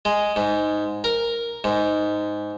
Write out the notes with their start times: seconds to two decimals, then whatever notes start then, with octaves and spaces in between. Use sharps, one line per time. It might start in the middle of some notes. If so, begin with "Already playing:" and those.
0.05 G#3
0.36 G#2
1.04 A#4
1.64 G#2